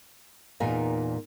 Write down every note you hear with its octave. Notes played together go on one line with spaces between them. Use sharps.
E2 A#2 D#4 A#4 G#5